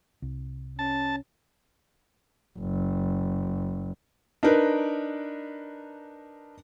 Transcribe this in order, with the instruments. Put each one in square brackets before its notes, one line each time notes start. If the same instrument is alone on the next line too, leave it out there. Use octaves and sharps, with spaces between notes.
[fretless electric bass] C2
[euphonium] C#4 [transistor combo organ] A5
[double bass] F#1
[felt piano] D4 D#4 A#4 B4